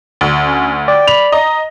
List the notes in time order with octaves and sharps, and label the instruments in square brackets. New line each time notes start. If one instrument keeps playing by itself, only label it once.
[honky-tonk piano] D2
[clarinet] C#4
[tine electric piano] D5 [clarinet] G5
[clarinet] B5 [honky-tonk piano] F7
[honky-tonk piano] D#5 [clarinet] A#5